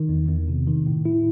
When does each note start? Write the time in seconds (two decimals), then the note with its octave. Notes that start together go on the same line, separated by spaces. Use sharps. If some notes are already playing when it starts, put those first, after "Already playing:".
Already playing: D#3
0.09 E2
0.29 E2
0.48 C3
0.67 D#3
0.87 A2
1.05 E4